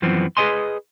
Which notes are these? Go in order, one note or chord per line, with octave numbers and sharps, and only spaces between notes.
F#2 E3 F3 B3 C4
G#4 A#4 B4 D#5 G#5 C6